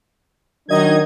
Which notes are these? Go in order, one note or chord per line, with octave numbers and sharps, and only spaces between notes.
D#3 F#3 D4 D#4 D#5 G#6